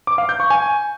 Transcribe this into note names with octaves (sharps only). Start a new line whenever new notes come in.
D6
F5
G6
C#6
G#5